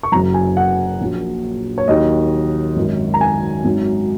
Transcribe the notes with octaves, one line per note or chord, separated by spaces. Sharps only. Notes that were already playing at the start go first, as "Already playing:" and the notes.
C#6
F#1 F#2 F#3 A#5
G#5
F#5
A#1 A#2 F#3
C#5
D#2 D#3 F#3 D#5
G#1 F#2 D#3 F#3
A#5
G#5
G#1 F#2 D#3 F#3